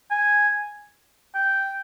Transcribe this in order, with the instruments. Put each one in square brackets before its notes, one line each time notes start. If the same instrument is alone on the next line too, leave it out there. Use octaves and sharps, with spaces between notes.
[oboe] G#5
G5